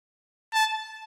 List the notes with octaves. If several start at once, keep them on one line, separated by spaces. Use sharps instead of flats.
A5